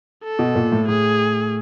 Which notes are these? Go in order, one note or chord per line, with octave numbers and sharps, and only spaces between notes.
A4
B2
A#2
A2
A2 G#4